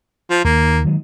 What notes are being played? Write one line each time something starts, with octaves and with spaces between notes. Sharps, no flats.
F3
D#2 D#3 A#3
D#3 F#3 G#3